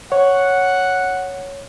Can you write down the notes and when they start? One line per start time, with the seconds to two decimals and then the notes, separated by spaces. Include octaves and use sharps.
0.12 C#5 F#5